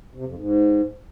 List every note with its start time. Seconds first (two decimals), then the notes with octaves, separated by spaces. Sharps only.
0.15 C3
0.26 F2
0.36 G#2